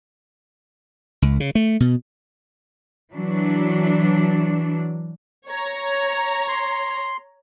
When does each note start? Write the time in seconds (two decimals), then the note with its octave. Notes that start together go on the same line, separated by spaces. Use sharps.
1.22 C#2
1.40 C#3
1.55 A3
1.80 B2
3.13 E3 F#3 D4
5.48 C#5 A#5
6.48 C6